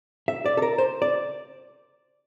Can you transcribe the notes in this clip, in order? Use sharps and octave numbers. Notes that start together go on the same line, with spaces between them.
E5
D5
A4
A#4
C5
D5